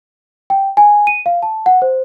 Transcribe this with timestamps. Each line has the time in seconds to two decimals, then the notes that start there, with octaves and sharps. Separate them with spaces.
0.50 G5
0.77 G#5
1.07 D#7
1.26 F5
1.42 A5
1.66 F#5
1.82 C5